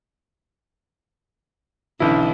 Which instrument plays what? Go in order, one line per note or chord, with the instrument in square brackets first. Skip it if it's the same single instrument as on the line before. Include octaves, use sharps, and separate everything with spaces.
[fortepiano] B1 E4 [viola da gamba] D3 E3 C#4